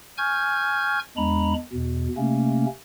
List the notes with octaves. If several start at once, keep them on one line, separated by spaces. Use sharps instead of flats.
G#5 C#6 F6 G6 G#6
E2 G#3 D4 A#5 B5
E2 B2
C3 A3 A#3 C#4